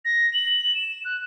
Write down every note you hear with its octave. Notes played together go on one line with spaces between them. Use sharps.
A#6
F#7
E7
F#6